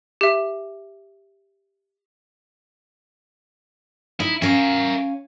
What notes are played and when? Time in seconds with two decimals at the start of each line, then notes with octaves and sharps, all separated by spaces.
0.21 G4 E5
4.20 D#4 E4
4.42 C#4 A#4 E5 F5